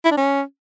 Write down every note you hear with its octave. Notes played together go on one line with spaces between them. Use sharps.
E4
D4
C#4